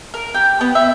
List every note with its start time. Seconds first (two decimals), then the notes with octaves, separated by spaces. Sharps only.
0.14 A#4
0.34 G4
0.61 B3
0.75 E5